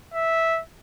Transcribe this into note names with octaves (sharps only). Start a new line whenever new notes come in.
E5